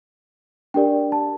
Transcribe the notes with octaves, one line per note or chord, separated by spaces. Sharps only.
D4 G4 A#4 D5 G5
A5